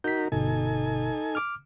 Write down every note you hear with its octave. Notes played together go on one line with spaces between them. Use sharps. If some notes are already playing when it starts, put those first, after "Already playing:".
D#4 F#4 A#4 G6 B6
G1 B2 D#4 A4 G#5
D6 F6